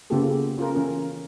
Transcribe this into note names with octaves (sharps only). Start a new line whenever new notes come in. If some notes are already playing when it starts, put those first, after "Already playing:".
C#3 A#3 B3 F4 G4 A4
C#4 F4 A4 A#4
E3 C#4 A#4